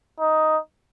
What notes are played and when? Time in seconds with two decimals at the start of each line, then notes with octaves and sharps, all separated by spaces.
0.20 D#4